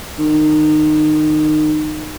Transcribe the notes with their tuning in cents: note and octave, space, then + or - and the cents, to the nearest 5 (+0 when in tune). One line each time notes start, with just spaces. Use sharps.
D#3 -25